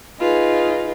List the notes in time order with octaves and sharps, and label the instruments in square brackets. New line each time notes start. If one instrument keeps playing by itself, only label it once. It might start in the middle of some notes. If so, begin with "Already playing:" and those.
[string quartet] D#4 F4 G#4 B4